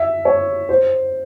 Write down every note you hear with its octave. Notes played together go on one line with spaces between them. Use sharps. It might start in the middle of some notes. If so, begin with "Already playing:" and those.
Already playing: E5
C#5
C5